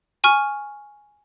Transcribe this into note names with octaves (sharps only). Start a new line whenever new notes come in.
G#5 C#6 F6